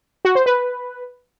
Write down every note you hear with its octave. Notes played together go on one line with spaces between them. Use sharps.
F#4
C5
B4